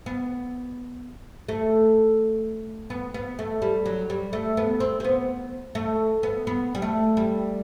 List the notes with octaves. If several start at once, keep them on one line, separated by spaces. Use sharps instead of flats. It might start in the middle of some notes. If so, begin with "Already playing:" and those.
B3
A3
B3
B3
A3
G3
F#3
G3
A3
B3
C4
C4
B3
A3
B3
B3
G3
A3
G3